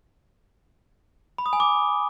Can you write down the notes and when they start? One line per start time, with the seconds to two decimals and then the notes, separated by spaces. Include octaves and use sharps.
1.38 B5
1.46 D#6
1.53 G#5
1.60 D6